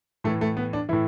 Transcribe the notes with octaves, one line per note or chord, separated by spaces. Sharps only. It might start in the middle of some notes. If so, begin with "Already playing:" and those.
A2 E3 A3
A3
B3
D4
A2 E3 E4